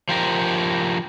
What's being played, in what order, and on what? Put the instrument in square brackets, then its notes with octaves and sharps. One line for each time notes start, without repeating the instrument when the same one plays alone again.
[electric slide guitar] F3 G4 A#4